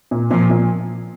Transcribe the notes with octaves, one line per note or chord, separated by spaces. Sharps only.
A#2
A#2 F3
A#2